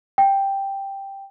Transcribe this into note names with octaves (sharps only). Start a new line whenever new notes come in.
G5